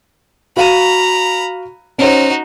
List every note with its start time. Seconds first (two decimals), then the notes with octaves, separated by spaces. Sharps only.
0.57 F#4 F5 A#5 B5 D#7
1.98 C#4 D#4 F#4 C5